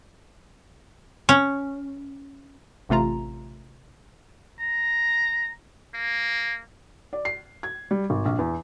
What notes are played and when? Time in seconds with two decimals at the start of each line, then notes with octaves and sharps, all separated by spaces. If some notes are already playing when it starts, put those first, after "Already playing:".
1.29 C#4
2.89 A1 C3 A3 F4 A#5
4.60 A#5
5.94 A#3
7.13 D5
7.25 C7
7.63 G#6
7.91 G3
8.10 G#1
8.25 A#1
8.39 E2